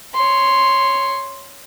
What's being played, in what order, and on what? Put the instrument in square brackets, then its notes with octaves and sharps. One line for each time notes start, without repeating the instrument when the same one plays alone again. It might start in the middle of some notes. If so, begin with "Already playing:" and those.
[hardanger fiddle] C#5 C6